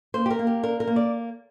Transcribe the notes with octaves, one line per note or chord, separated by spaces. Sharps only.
A#3 C5
G4
A#4
A#3
G4
D4 A#4
A#4
A#3
D5